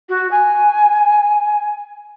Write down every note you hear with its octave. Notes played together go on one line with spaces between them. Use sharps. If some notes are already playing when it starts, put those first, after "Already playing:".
F#4
G#5